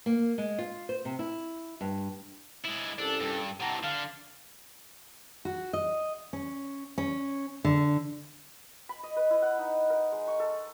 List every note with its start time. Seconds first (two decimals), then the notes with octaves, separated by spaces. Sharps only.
0.06 A#3
0.38 G#3
0.58 F4
0.89 C5
1.05 C3
1.19 E4
1.81 G2
2.65 G#3 E4
2.99 C2 C#4 D4 A4
3.20 G2
3.60 C3 E3 F#5 A5 A#5
3.83 D3 F5
5.45 F#4
5.73 D#5
6.33 C#4
6.98 C#4
7.65 D3
8.89 B5
9.03 D#5
9.16 B4
9.30 E4
9.42 F#5
9.59 D#4
9.90 A#4
10.12 G#3
10.27 C#6
10.40 A4